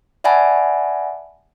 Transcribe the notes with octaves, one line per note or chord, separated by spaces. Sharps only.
D5 E5 F#5 G#5 A5 B5